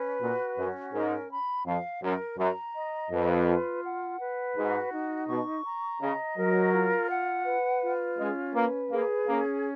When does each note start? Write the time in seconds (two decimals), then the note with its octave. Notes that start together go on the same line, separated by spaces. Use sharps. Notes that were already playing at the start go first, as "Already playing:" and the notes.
Already playing: C#4 B4
0.21 A#2 F#4
0.57 F#2 C#4
0.93 G#2 A#4
1.30 B5
1.65 F2 F5
2.02 F#2 A#4
2.38 F#2 A#5
2.74 D#5
3.11 F2 B4
3.48 F4
3.84 F#5
4.20 B4
4.56 G#2 F#4
4.92 D#4
5.28 B2 C#6
5.64 A#5
6.01 C#3 D#5
6.37 F#3 A#4
6.73 F4
7.10 F#5
7.46 B4
7.82 F4
8.18 G#3 C#4
8.54 A#3 B4
8.90 A#3 G#4
9.27 A#3 C#4